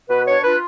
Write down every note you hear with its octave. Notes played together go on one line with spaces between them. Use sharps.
B2 B4
D4 C#5
F4 B4